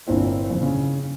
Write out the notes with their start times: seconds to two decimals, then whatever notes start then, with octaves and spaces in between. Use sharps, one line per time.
0.07 G1 A#2 C4 E4
0.50 F2 C#3
0.62 C#3